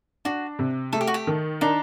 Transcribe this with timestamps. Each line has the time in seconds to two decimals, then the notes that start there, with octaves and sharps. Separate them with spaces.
0.25 D4 F#4
0.59 C3
0.93 A3 A4
1.01 G4
1.07 F#4
1.14 G4
1.27 D#3
1.61 D4 D#4